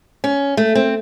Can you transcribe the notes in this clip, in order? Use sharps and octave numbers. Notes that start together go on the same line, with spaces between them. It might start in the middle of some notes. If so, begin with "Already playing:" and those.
C#4
A3
C4